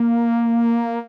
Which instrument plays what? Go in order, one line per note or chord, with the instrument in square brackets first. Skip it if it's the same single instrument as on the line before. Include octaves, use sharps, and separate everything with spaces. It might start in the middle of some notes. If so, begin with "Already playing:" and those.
Already playing: [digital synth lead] A#3